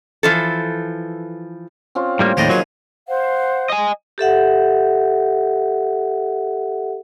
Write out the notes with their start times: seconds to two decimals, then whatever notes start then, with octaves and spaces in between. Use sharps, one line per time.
0.23 E3 F3 A4
1.95 C4 C#4 F4
2.19 A2 G3 A#3
2.37 D#2 A2 F3 G#3 D4 G4 D#5
2.49 A#2 D#3 F#3 G#4
3.07 C5 F5 F#5
3.70 D#5 G#5
4.18 G4 A4 E5 F#5